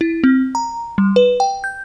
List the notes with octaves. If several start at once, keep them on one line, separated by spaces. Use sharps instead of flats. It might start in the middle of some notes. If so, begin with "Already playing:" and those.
E4
C4
A#5
G3
B4
G5
G6